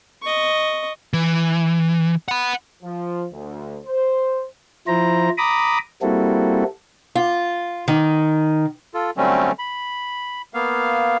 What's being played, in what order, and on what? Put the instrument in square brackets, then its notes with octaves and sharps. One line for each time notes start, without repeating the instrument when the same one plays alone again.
[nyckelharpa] D#5 C#6
[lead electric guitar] E3
F#5 B5
[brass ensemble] F3
D2
C5
[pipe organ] F3 E4 C5 A#5
A#5 B5 D6 D#6
G3 A#3 C4 E4 F#4 A4
[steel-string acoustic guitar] F4
D#3
[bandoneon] F4 A4
D3 F#3 G3 A3 C4 C#4
B5
A#3 B3 F5